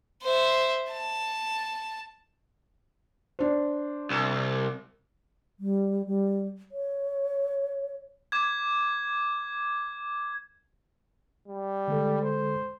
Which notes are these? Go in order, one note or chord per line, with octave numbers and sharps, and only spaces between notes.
C5 E5
A5
D4 C5
C2
G3
G3
C#5
D6 G#6
G3
D3 G#3 A4
C5